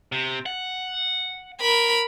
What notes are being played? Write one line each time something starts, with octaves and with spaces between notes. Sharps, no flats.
C3
F#5
A#4 B5